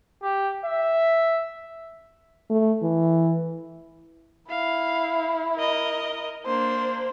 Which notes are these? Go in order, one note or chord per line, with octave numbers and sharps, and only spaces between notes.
G4
E5
A3
E3
E4 F5
A#4 D#5
A#3 D4 C5